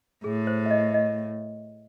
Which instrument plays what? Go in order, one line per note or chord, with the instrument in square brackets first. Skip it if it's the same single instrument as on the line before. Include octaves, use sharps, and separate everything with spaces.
[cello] A2 [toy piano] G#4
[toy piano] C5
E5
D#5
D#5